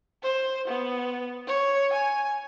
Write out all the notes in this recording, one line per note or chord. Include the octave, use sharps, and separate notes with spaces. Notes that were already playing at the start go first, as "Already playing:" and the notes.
C5
B3
C#5
G#5